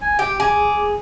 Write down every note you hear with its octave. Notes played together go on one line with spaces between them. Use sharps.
G#5
G4 G5
G#4 D6